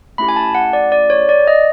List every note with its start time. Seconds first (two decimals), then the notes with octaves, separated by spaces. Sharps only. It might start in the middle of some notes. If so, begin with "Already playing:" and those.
0.18 A3 C#4 E4 G4 B5
0.28 G#5
0.36 A5
0.55 F#5
0.73 D5
0.92 D5
1.10 C#5
1.29 D5
1.47 D#5